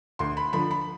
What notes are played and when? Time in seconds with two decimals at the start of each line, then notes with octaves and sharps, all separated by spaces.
0.19 D2 C6
0.37 B5
0.53 D3 F3 B5
0.71 B5